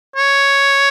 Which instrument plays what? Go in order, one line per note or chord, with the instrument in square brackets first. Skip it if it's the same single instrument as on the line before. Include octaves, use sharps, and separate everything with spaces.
[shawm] C#5